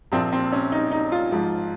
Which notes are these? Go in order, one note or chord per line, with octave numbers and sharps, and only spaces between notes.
A#1 A#2 F3 C4
C4
C#4
D#4
D#4
F4
G#1 G#2 F3